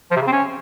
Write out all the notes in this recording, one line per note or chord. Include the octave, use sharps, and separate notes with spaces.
F3
C3
C#3
C4
C#4